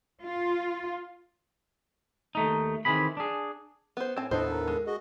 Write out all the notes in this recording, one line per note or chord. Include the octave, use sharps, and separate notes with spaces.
F4
D#2 A3 D#4
D#3 E3 C4 G#4 B5
D4 G#4
B3 C5
A2 C4 G#5 A5
D#2 A2 B3 D4 A4 B4 C5 D#5
A#4
G#3
F#4 G#4 D#5